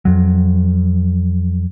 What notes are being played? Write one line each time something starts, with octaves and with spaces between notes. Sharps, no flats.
F2 F#3